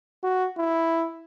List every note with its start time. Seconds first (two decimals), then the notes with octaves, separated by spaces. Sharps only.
0.24 F#4
0.58 E4